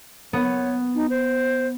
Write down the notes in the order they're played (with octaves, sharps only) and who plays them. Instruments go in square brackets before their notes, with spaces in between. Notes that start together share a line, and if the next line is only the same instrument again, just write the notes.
[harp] B3 [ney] C#5
[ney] D#4
C5